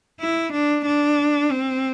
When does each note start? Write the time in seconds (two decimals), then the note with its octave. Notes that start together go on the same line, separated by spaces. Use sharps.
0.20 E4
0.52 D4
0.86 D4
1.51 C4